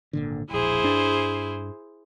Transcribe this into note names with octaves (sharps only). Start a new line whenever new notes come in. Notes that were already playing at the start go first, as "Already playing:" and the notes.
G#1 A#2 D3
E1 A#1 E4 G#4 C5
G2 D4